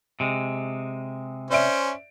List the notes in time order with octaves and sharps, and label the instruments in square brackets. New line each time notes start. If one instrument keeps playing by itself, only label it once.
[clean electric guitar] C3 G#3
[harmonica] C#4 C5 [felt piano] D5 E5 D7